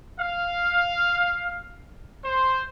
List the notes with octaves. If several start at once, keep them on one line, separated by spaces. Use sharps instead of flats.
F5
C5